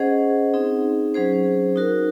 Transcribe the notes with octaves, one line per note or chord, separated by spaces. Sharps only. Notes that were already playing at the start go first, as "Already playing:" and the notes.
Already playing: C#4 G#4 C5 D#5 F#5
C4 D#4 G#4
F#3 C#4 G#4 C5
D#4 F#4 A#4